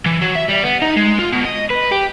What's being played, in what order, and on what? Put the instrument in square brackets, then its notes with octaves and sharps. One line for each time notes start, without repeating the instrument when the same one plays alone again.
[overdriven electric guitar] E3
F#3
E5
G3
B3
D#4
G#3
F4
B2
D#5
B4
G4